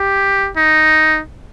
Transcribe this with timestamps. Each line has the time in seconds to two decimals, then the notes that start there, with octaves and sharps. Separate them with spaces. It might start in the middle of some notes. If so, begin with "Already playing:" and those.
Already playing: G4
0.57 D#4